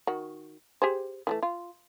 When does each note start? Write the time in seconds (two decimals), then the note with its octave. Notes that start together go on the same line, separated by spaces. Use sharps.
0.07 D#3 F#4
0.82 G4 G#4 C5
1.27 E3 F#3 A3
1.43 F4